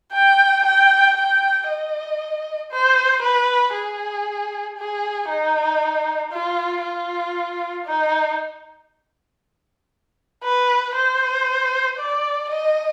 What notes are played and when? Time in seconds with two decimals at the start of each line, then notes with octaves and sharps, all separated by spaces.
0.13 G5
0.65 G5
1.17 G5
1.69 D#5
2.72 C5
3.22 B4
3.74 G#4
4.78 G#4
5.29 D#4
6.32 F4
6.83 F4
7.86 D#4
10.44 B4
10.95 C5
11.99 D5
12.49 D#5